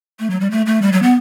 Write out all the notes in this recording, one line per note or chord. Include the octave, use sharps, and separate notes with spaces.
A3
F#3
G3
A3
A3
G3
F#3
B3